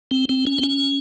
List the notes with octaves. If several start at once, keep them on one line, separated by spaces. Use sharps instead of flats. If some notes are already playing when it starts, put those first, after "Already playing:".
C4
C4
C#4
C4
C#4